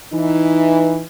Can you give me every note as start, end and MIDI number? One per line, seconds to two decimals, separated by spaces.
0.13 1.03 52
0.13 1.03 63